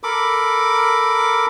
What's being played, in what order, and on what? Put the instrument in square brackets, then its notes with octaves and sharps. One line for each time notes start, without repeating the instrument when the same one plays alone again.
[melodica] A4 A#4 B5 D6